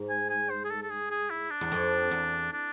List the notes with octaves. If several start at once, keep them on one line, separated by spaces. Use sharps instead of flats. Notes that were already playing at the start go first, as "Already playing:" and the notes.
Already playing: G#2
G#5
G#5
C5
G#4
A4
A4
G#4
G#4
E4
D4
E2
F2
E2
D4